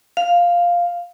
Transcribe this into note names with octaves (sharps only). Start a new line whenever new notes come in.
F5